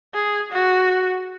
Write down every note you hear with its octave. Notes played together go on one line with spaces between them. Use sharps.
G#4
F#4